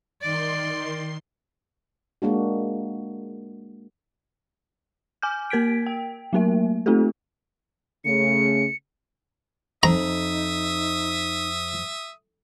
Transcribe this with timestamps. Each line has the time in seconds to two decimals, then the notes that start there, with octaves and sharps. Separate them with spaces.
0.22 D#3 D5 C6 C7
2.22 G#3 A#3 D4 F#4
5.22 G#5 D6 F6 G6
5.50 A#3 A#4 G#6 B6 D7
5.86 G5
6.33 F#3 A3 A#3 A#4 E5
6.86 A3 C4 D#4 F4 G4 A4
8.05 C#3 A3 C#7
9.83 F2 D#4 E5 A#5 D#6